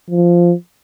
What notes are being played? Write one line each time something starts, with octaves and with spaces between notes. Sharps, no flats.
F3